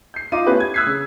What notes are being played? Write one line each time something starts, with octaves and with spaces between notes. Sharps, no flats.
G6 C7
D#4 F4 D6 D#7
A3 B3 C#4 E4 G4 B4
G#6
D#6 E6 F#6 G#6 B6 C7
C#3